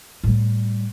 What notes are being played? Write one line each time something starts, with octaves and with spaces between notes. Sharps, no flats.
A2 G3